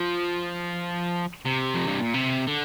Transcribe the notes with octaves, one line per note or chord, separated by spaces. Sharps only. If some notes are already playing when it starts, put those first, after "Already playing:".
Already playing: F3
C3
F2
G2
A#2
C3
D3